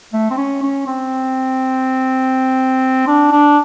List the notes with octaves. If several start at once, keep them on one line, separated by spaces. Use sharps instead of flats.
A3
C4
C#4
C#4
C4
D4
D4